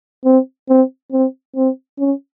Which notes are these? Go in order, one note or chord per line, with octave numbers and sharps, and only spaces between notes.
C4
C4
C4
C4
C#4